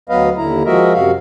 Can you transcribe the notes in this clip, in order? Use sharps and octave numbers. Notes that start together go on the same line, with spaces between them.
D2 F#3 B3 B4 D#5 F5
D#2 D3 E4 A#5
F3 G#3 F#4 A#4 D#5 E5
F#2 C3 F#4 F5